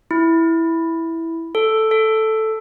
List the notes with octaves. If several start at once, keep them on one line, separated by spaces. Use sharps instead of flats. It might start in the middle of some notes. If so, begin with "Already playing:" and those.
E4
A4
A4